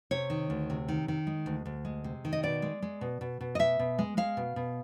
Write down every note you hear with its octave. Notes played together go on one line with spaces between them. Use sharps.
C3 C#5
D#3
D2
C3
D#3
D#3
G#3
D2
D2
G#3
C3
D#3
D#5
B2 D5
G#3
G#3
B2
B2
B2
D#5
B2 E5
B2
G#3
G#3 F5
B2
B2